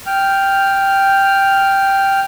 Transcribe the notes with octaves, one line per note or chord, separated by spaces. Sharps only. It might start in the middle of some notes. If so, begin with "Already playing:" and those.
G5 F6